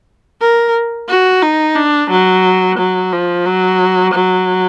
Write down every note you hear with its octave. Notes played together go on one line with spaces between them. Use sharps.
A#4
F#4
D#4
D4
F#3
F#3
F3
F#3
F#3